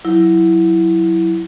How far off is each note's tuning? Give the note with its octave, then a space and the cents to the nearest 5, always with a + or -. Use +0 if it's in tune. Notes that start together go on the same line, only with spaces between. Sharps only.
F#3 -5 E4 +0